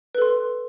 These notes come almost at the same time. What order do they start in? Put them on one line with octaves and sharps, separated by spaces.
B4 A4 C6